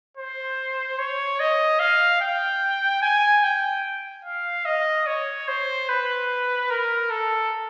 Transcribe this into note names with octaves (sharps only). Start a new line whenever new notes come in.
C5
C#5
D#5
F5
G5
G#5
G5
F5
D#5
C#5
C5
B4
A#4
A4